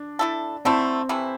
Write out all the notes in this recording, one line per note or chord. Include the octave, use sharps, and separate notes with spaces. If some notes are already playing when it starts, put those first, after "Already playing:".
Already playing: D4
A3 E4 A4
D3 A3 C4 E4
C3 E3 A3 E4